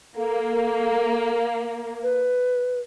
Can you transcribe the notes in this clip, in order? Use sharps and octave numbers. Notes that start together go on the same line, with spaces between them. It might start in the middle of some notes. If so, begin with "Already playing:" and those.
A#3 A4
B4